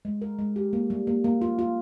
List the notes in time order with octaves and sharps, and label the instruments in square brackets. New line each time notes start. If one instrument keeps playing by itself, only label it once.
[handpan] G#3
A#4
G#3
G4
A#3
G3
A#3
A#3
F4
F4